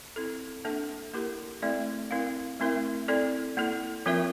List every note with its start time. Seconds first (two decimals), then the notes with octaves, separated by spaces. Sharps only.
0.16 C4 E4 A4
0.65 A#3 D4 A4 E5
1.14 A#3 E4 G4 A#4
1.62 A3 C4 E4 A4 D5
2.11 C4 E4 A#4 F5
2.60 A3 C4 E4 A#4 E5
3.08 C4 E4 A4 D5
3.57 A#3 E4 A4
4.06 F3 C4 F4 A#4 E5